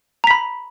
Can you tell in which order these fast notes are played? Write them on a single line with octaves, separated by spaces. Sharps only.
A#5 B6 B5